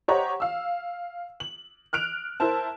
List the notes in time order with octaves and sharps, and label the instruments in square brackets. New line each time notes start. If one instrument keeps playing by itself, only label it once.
[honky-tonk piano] G4 C5 C#5 D#5 F#5 A#5
F5 E6
F#7
F6 F#6 D7 F7
E4 A#4 C5 A5